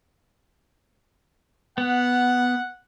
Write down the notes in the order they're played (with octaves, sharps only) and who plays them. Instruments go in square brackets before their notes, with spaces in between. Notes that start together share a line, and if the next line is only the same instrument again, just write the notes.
[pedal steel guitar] B3 [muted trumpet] F#5